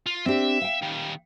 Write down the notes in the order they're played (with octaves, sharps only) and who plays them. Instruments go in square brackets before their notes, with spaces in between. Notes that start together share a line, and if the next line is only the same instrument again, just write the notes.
[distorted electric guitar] F4
[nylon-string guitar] C4 D4 G4 [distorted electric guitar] E5
[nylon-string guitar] F5 G5
[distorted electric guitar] D#3 G3